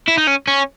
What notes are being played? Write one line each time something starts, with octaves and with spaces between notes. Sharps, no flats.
E4
D#4
C#4
C#4